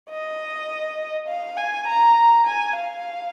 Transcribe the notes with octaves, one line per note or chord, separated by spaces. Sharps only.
D#5
F5
G#5
A#5
G#5
F5